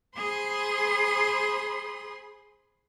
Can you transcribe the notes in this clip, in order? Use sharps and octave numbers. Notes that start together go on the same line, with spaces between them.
G#4 C5 B5 C6 D#6